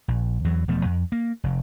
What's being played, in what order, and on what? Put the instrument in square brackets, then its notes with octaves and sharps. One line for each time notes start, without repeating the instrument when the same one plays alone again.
[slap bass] A#1
E2 E3 F#3
E1 B2 F3 A3
F2
A#3
F1